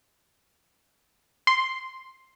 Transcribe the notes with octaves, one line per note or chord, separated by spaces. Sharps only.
C6